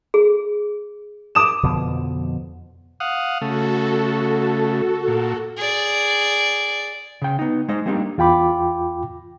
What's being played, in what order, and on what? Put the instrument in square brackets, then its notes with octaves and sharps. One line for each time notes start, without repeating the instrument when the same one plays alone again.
[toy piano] G#4
[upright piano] D6 D#6 E7
[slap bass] F2 B2 D3 F3
[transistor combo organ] F5 F#5 D#6
[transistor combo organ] C#3 A3 [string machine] F#4 A4
[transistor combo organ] A#2
[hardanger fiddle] G#4 D5
[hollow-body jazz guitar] C#3 G5
B3 D#4
G#3 D#4 C5 D#5
G3 A#3 C4 D4 D#4 G4
[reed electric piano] E2 F4 G5 B5 D6